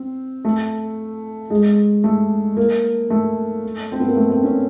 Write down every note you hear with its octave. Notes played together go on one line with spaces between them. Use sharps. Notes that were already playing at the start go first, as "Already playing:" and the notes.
Already playing: C4
A3
G#3
A3
A#3
A3
C4
B3
A#3
A3
C4
C#4